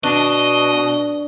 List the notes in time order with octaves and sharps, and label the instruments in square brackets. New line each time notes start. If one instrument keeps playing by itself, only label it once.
[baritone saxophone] B2 [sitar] D4 [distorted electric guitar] D#5